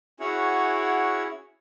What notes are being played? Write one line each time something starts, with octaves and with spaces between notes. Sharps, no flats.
C#4 E4 F#4 G#4 C#5 F#5